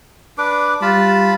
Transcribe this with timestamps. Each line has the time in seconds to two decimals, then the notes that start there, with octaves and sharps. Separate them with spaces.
0.38 D4 B4 D6
0.82 G3 F4 A5 B5